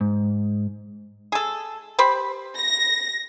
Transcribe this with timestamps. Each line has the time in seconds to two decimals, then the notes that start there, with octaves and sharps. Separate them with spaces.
0.01 G#2
1.32 G#4 A4
1.99 G4 C5 B5
2.57 A#6